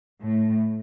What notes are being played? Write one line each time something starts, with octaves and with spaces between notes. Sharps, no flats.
A2